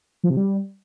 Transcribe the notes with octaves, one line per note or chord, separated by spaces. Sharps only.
F3
C3
G3